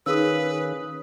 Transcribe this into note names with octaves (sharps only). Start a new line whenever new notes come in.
D#3 C#4 D#4 G#4 B4 F5 D#6 E6